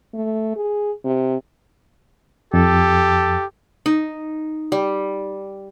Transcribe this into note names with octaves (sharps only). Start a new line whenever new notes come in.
A3
G#4
C3
F2 G4 A4
D#4
G3